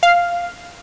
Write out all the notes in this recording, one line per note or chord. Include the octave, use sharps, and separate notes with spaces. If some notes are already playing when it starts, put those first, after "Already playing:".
F5